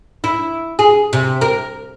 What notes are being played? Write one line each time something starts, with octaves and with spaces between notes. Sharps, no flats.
E4
G#4
C3
A#4